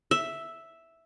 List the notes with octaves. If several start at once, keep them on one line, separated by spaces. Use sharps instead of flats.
E5